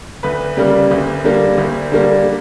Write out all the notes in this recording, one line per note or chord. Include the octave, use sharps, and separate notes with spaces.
D2 B4
C#3 G3 A#3
D2
D3 G3 A#3
D2
D3 G3 A#3